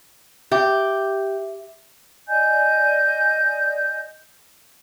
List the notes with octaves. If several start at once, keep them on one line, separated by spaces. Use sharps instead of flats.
G4 E5
D5 D#5 G#5 G6